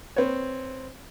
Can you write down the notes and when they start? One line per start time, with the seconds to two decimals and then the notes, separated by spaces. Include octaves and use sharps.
0.16 C4 B4 C#5